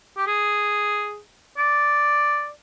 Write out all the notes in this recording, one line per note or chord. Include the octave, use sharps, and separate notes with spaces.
G4
G#4
D5